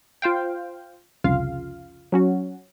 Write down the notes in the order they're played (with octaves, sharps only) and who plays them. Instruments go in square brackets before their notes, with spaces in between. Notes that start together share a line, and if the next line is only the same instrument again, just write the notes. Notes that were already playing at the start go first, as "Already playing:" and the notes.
[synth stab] F4 C5 F5 G5
C2 F2 C#3 F4 F5
F#3 C#4 F#4